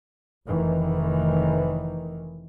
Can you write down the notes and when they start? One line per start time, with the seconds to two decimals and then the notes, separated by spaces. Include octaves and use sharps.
0.48 F1 D#3 E3